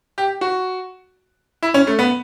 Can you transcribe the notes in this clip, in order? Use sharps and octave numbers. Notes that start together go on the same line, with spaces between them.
G4
F#4
E4
C#4
A3
B3